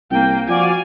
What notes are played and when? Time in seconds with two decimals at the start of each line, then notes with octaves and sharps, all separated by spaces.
0.11 C2 A#3 G5
0.48 F3 F#4 D5 F5 G#5